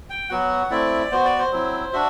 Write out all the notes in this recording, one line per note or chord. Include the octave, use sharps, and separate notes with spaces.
G5
F#3 B3 F#4 F#5
A3 C4 E4 D5
B3 F#4 C5
D5
C5
F#3 C4 E4
D4 F#4 E5